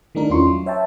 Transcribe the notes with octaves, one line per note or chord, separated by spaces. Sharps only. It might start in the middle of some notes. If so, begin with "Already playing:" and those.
D#3 G3 A3 D4 D#4 A#4
E2 C#4 E4 F4 C6 C#6
F#3
C#5 E5 G5 A5